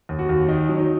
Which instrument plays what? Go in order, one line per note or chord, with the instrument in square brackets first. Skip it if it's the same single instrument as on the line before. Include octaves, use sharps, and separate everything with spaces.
[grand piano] D#2
F#4
D#2
D#3 D#4
F#3
D#4